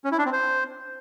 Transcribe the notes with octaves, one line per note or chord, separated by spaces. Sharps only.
C#4
E4
D4
C4
C5